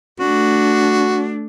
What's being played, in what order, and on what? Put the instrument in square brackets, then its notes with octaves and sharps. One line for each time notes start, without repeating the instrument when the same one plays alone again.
[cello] A3 D4 [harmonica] F#4